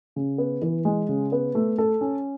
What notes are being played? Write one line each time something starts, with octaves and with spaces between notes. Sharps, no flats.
C#3
B3
E3
G#3
C#3
B3
A3
A4
C#4